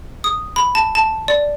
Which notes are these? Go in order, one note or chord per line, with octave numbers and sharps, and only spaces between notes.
D#6
B5
A5
A5
D5